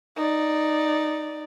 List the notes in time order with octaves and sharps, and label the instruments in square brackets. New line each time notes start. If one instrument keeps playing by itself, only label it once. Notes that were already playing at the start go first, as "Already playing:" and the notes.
[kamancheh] D#4 D5